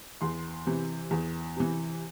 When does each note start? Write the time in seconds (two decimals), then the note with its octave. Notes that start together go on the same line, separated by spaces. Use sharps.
0.21 E2 C6
0.67 C3 E3
1.11 E2
1.57 C3 E3